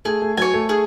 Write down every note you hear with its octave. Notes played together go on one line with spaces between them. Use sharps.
A3 G#4
A3
F#3 C#5 G#5
A3
G#4